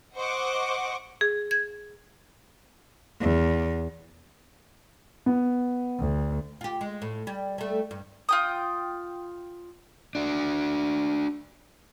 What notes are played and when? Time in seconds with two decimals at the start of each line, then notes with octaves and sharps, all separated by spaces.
0.16 C5 D#5 F#5 C#6 D6
1.21 G#4
1.51 G#6
3.22 E2
5.26 B3
6.00 D2
6.61 F4 G4
6.81 G#3
7.02 A2
7.27 G3
7.58 G3 A3
7.91 G2
8.29 F4 G5 D#6
10.15 D4 F#4